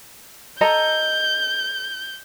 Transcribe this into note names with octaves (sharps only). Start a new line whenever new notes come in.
A4 D#5 A#5 G6